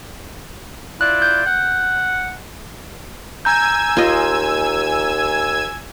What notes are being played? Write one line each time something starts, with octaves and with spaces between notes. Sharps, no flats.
E4 F4 D5 F#6
G6
F#5
G#5 A#5 E6 G6 G#6
D#2 F4 D#5